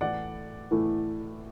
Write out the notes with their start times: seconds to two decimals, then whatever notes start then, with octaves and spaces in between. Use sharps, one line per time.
0.01 A2 E3 A3 E4 D5 F#5
0.71 A2 E3 A3 E4